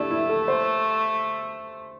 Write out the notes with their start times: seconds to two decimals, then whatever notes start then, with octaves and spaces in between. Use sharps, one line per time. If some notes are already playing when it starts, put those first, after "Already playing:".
Already playing: A3 D4 E4 G4
0.10 E4
0.29 A4
0.48 C5